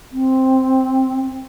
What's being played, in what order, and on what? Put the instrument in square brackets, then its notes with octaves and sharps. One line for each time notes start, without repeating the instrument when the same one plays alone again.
[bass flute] C4